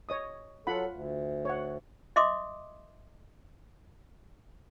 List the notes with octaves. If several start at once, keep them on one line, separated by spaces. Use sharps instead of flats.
C#5 D#5 D#6
F#3 F4 A4 F#5 B5
D2
C#5 F#5
D#5 E5 C6 D6 D#6